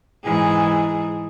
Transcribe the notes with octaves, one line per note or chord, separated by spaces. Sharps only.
G#2 E3 G#4